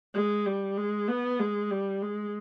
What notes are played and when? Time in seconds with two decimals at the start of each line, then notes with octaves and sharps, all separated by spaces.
0.14 G#3
0.45 G3
0.77 G#3
1.08 B3
1.39 G#3
1.71 G3
2.02 G#3